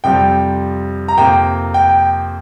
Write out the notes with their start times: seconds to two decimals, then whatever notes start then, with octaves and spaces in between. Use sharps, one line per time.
0.04 F2 C3 G3 G5
1.08 A#5
1.17 F2 C3 A#3 G5
1.74 G5